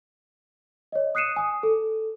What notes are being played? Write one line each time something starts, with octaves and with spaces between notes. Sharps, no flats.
C#5 D#5
D#6 F#6 C7 C#7 D#7 E7
G#5 D#6
A4